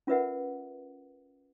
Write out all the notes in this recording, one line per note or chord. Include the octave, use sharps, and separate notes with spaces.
C#4 F4 A#4 B4 E5 F#5